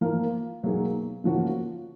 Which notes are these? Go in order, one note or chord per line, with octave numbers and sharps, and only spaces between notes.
F3 A#3 F4 A#4
B2 F#3 A#3 D#4 G#4
C#3 F3 A#3 C#4 F#4